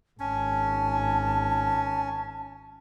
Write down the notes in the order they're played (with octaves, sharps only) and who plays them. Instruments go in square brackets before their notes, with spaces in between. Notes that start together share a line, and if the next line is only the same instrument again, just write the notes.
[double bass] G#1 [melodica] C#4 [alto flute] A5